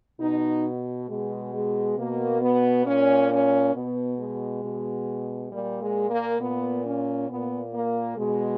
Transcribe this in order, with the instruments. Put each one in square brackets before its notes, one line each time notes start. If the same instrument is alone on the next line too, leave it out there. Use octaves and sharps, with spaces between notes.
[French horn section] B2 D#4
B2 G#3
G#3
B2 A#3
B3
A#2 C#4
C#4
B2 B3
G#3
B2
A#2 G3
G#3
A#3
A#2 B3
C#4
A#2 B3
A#3
B2 G#3